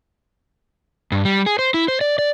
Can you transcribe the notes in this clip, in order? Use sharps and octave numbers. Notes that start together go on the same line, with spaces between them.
G2
G3
G#4
C5
E4
C5
D5
D5